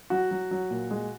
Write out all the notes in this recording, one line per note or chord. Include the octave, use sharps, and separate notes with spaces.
F#3 F#4
F#3
F#3
A#2
G#3